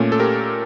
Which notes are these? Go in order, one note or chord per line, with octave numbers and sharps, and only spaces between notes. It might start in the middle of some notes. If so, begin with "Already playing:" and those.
Already playing: A#2 A3 C#4
A4
G4 A#4